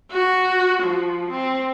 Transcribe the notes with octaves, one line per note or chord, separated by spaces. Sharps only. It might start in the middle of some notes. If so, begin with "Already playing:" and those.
F#4
F3
C4